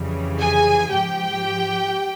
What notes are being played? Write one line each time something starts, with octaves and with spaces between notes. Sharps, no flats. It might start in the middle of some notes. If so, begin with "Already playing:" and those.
Already playing: F2 C#3 E3 G3
G#4 G#5
G#2 F3 G4 G5